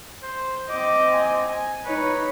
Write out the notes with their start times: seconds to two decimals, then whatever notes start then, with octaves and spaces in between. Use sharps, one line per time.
0.23 C5
0.70 C4 D#5 D6
1.13 G#5
1.48 G#5
1.85 D#4 B4 C#5